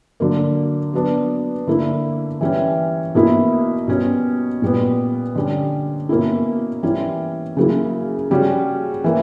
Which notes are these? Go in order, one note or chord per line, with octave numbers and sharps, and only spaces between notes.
D3 F#3 A#3
F#3 B3 D4
D3 A#3 E4
E3 G3 C#4
B2 A#3 E4
B2 G3 C#4
A#2 G3 B3
D3 G3 C#4
B2 A#3 C#4 E4
E3 G3 C#4 E4
C#3 F#3 A#3 E4
C#3 G3 C#4 F#4
E3 A#3